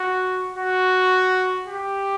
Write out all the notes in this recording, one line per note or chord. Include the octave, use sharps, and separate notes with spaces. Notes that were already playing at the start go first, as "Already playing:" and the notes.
Already playing: F#4
F#4
G4